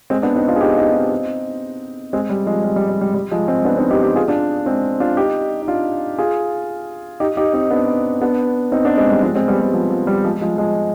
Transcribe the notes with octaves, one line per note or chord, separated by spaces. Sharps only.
G#3 C4
B3 D4
C4 D#4
D4 F4
G#4
D#4 G4
D#4 G4
C4 D#4
G#3 C4
G3
F3 G#3
G3
G3
G3
G3
G3
F3 G#3
G#3 C4
B3 D4
C4 D#4
D#4 G4
D#4 G4
F4 G#4
D4 F4
G#3 C4
D4 F4
D#4 G4
D#4
D4 F4
F4 G#4
D#4 G4
D#4 G4
C4 D#4
B3 D4
B3 D4
C4 D#4
B3 D4
G#3 C4
G3
F3 G#3
G#3 C4
G3 B3
G3
F3
F3
G3
F3 G#3
F3 G#3
F3 G#3